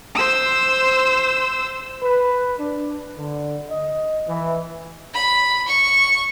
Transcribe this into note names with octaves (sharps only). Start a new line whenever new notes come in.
C5 E6
B4
D4
D3
D#5
E3
B5
C#6